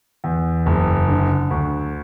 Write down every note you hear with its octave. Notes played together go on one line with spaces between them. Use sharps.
E2
F#1
D3
D2